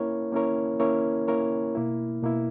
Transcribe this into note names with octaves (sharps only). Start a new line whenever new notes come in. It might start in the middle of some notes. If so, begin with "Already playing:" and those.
Already playing: A#3 C#4 E4 A#4 C#5
A#3 C#4 E4 A#4 C#5
A#3 C#4 E4 A#4 C#5
A#3 C#4 E4 A#4 C#5
B2 A#3 E4
B2 A#3 E4